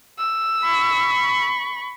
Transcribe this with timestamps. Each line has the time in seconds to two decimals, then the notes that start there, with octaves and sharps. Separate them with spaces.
0.18 E6
0.65 B5 C#6